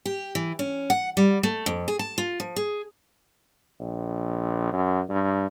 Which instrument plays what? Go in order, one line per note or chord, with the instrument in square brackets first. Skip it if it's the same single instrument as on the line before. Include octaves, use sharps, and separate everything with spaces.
[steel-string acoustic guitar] G4
E3
C#4
F#5
G3
A3
F2
G#4
A5
F4
F3
G#4
[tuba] A#1
F#2
G2